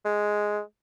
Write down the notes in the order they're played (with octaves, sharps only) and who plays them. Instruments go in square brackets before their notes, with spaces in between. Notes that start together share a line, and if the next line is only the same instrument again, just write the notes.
[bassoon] G#3